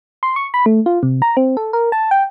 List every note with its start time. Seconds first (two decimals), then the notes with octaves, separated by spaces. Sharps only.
0.23 C6
0.36 C#6
0.54 B5
0.66 A3
0.86 F4
1.03 C3
1.22 A#5
1.37 C4
1.57 A4
1.73 A#4
1.92 A5
2.11 G5